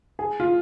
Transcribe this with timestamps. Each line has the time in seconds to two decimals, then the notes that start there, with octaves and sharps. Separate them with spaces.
0.19 G#4
0.40 F4